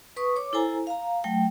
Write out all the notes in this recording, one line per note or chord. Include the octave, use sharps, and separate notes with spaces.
B4 C#6 D#6
C#5 D6
E4 A4 C5 G#5 A#5
F5 A#5
F#3 A3 G5